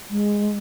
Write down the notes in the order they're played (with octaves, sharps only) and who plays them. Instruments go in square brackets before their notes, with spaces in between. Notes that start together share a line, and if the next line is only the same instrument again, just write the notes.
[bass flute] G#3